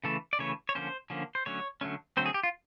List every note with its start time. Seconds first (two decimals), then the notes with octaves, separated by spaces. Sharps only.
0.04 C#3 E3 A3 A4
0.33 D5
0.39 C#3 E3 A3 C#5
0.69 C#5
0.75 D3 F3 A#3 C#4 C5
1.10 D3 F3 A#3 C#4
1.35 C5
1.46 D3 F#3 A3 C#4 C#5
1.81 D3 F#3 A3 C#4
2.17 D3 F#3 A3 C4 C5
2.26 G#4
2.34 G4
2.43 F4